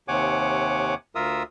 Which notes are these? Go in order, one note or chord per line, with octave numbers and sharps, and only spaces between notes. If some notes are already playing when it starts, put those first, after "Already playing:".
D#2 C3 C#5 F#5 G#5 D6
D2 F4 A#4 E5 D#6 E6